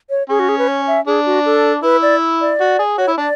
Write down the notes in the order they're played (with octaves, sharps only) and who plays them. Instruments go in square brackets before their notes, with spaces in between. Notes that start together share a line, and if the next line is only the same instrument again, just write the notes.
[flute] C#5
[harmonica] C#4 [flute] G#4
[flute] F#4
G#4
B4
C#5
E5
[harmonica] D4 [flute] G#4
[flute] F#4
A4
[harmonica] E4 [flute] B4
[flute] D5
D5
[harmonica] F#4
G#4
[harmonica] F#4 [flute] C#5
[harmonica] E4
[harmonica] D4 [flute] D5